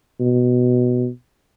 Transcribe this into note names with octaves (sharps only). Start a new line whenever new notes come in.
B2